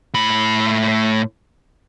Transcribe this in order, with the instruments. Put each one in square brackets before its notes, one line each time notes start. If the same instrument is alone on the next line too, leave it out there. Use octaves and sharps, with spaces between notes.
[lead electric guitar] A2 B5